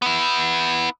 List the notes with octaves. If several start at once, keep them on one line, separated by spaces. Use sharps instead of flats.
B3 E4